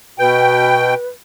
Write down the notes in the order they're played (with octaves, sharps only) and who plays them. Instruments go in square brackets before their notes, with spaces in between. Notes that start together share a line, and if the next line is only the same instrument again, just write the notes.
[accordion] B2 G5 [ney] B4